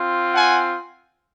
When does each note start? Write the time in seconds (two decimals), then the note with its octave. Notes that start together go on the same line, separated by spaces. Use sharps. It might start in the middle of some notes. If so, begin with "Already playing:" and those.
Already playing: C4 F4
0.34 F#5 G#5